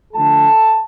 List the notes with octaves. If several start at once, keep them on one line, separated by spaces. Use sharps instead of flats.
D3 F3 A3 A4 A5